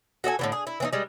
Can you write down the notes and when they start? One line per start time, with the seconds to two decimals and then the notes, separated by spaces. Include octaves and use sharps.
0.24 F#4 A4 D#5 G#5
0.39 A2 D3 E3
0.52 G#4
0.67 E4
0.80 E3 C4 D#4
0.93 G3 G#3